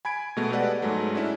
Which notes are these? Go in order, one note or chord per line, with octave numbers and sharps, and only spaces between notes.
G#5 B5 G#6 D7
B2 G#3 A3 B3
G4 A4 B4 D5 D#5 F#5
G#2 F#3 G#3 A3
C#4 D4 E4